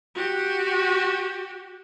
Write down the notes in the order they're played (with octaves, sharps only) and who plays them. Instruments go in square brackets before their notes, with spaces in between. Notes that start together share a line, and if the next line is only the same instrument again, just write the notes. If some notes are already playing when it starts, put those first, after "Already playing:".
[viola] F#4 G4